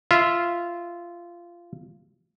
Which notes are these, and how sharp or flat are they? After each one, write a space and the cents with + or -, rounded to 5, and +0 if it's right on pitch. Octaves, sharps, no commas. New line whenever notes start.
F4 -15 E5 +0